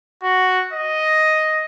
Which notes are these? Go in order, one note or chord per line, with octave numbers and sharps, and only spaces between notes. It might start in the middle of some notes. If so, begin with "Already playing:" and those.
F#4
D#5